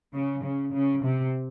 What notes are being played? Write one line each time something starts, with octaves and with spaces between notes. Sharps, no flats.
C#3
C#3
C#3
C3